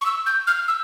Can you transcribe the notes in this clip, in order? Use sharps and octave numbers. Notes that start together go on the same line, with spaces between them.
C#6
E6
G6
F6
E6